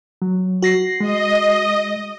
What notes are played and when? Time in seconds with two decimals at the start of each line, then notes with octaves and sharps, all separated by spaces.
0.22 F#3
0.62 F#4 A#6 C7
1.00 G#3 D#5